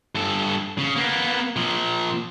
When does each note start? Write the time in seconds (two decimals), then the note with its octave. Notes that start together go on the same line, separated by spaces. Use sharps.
0.15 G2 A4
0.78 C#3
0.96 A#3 B3
1.56 A#2 F3